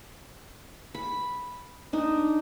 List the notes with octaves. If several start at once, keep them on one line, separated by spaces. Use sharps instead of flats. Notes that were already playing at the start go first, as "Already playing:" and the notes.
B5
D4 D#4